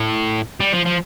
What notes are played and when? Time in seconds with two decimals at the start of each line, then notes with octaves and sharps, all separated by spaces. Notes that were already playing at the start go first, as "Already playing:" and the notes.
Already playing: A2
0.60 G3
0.73 F3
0.85 F3